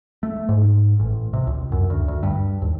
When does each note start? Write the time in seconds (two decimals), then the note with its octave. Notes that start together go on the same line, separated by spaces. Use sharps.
0.23 A3
0.49 G#2
1.00 A1
1.33 C3
1.47 C#2
1.72 F#2
1.90 D2
2.08 D2
2.23 G2
2.62 D#2